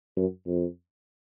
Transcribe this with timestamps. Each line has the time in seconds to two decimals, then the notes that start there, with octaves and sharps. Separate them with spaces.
0.17 F#2
0.47 F2